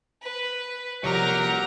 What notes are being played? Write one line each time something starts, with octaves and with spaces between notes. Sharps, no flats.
B4
C2 F3 F#4 G4 A#4 C#5 A#5